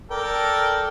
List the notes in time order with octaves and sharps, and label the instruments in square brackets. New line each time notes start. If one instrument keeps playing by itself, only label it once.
[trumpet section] A4 A#4 [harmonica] D5 G5